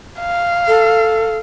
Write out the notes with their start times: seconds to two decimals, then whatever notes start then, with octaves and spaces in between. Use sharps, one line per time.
0.20 F5
0.68 A4